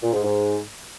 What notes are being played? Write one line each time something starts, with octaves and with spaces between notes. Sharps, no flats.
A#2
G#2
G#2